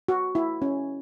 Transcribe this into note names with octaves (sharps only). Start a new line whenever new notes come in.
F#4
E4
C#4